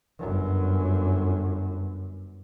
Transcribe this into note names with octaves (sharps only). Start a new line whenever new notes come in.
G1 F#2